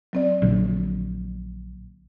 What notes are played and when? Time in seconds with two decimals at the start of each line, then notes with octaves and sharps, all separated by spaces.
0.13 F#3 C4 D5
0.42 A#1 D3 F#3